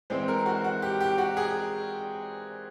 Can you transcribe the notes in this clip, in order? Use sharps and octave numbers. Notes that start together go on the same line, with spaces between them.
E3 G#3 C4 C5
A#4
F#4
F#4
G4
G4
F#4
G#4